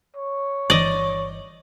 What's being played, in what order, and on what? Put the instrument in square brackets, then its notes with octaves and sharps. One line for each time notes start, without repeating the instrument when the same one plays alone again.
[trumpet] C#5
[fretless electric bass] G1 E3 [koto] D5 D#5